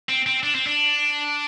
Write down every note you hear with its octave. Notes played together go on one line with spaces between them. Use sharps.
C4
C4
D4
C4
D4